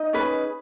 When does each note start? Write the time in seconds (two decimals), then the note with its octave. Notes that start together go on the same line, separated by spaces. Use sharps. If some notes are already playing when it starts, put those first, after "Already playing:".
Already playing: D#4 D#5
0.13 C#4 G#4 B4